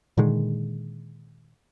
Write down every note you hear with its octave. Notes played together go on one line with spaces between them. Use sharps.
A#2 D3 D#3 G#3